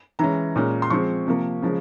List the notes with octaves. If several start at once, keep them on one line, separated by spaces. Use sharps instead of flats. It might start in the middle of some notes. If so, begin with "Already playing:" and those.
E3 G#3 C#4 A#5
A#2 G#3 C#4
C6
F3 G#3 C4 C#6
C3 F3 A#3
C#3 F3 G#3